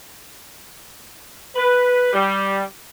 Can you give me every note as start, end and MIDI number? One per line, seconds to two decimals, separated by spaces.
1.56 2.10 71
2.13 2.63 55